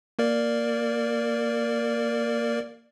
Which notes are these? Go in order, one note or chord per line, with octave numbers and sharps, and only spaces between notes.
A#3 A#4 D5